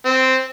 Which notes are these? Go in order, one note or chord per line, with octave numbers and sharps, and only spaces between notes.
C4